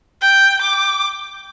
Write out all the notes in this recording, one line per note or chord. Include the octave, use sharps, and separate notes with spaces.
G5
D6